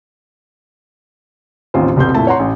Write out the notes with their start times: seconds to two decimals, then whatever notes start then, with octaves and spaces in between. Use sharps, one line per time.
1.74 A1 D#2 C4 F4 C5
1.96 F1 C2 B2 C6 G6
2.14 F1 A#2 A3 E4 A5
2.27 C#5 F#5 A#5 C6
2.40 A1